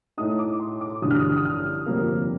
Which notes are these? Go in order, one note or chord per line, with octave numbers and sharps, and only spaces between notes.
A2 A3 D#4 D#6
D6
C6
D6
A1 G2 D3 F3 D#6
F6
D#6
D#6
F6
G1 F2 C3 G3 A#3